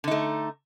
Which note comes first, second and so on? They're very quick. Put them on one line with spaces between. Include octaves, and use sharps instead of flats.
D3 D#4 A3